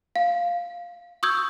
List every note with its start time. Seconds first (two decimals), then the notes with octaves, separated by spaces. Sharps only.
0.16 F5
1.23 C#6 D#6 E6 G6 G#6